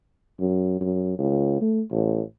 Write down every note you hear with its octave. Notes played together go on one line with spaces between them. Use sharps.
F#2
F#2
C#2
A3
A1